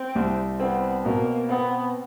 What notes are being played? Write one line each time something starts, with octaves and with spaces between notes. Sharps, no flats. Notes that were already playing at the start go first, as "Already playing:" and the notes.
Already playing: C4
C2
B3 C4
B2 A#3
B3 C4